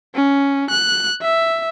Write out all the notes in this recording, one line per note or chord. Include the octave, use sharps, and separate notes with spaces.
C#4
F#6
E5